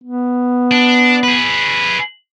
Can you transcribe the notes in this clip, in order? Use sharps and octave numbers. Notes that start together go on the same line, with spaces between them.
B3
D4
G#4 B4